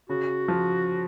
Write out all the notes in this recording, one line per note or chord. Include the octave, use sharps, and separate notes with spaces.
C#3 F#4
F3